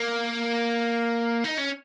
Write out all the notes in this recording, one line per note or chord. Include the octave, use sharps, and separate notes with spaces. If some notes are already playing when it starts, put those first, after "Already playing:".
Already playing: A#3
D#4
C#4